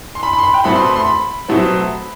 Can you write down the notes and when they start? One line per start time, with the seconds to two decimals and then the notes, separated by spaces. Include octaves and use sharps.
0.15 C6
0.23 B5
0.33 B5
0.39 C6
0.43 B5
0.54 G5
0.64 B2 A3 C4 B5
0.75 C6
0.85 B5
0.96 C6
1.06 B5
1.48 B2 F#3 A3 C4